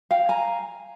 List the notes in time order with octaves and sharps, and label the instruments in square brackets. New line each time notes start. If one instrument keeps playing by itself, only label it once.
[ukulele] F5 G5
G#5 A#5